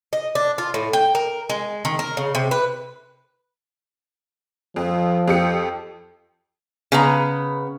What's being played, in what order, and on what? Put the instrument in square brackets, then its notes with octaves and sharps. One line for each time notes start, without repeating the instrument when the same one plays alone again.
[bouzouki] D#5
D4
F4
A2
G5
A#4
G#3
D#3
A#4
C#3
C3
B4
[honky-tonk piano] F2 [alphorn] F3
[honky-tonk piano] F2 G4 C#7
[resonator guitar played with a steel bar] C#3 B3 A#5